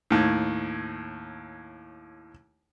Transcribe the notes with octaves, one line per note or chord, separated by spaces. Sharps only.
D#2 A2